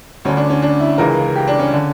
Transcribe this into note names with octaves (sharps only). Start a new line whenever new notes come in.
D2 D3 C#4
D4
C#4
D4
E4
C#2 C#3 E3 A#4
G4
D4
C#4
D3